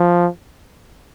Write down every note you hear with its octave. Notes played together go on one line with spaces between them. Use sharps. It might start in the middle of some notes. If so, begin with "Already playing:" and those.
Already playing: F3